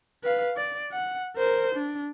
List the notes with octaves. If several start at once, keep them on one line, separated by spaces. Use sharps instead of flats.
B4 F5
D5
F#5
A#4 C5
D4